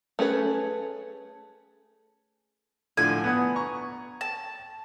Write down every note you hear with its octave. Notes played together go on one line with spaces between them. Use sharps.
A3 C#4 G#4 B4
A2 D3 F3 G#5
B3 F#5 D#6
A#5 C#6
A5